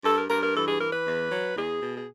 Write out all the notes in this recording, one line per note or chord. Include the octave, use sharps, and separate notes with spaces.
G2 A4
A#4
G2 A#4
A#4
E3 A4
G#4
E3 A#4
B4
E2
F#3
E2 G#4
B2
G#4